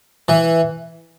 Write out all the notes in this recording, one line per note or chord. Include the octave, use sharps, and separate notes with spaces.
E3